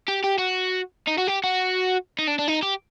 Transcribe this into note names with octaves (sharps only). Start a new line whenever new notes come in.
G4
G4
F#4
D#4
F#4
G4
F#4
D#4
D4
D4
D#4
G4